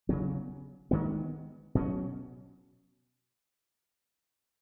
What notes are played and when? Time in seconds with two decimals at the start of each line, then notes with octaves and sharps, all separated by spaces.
0.09 C#3 F#3 B3
0.91 D#3 G#3 B3
1.75 B2 F#3 C#4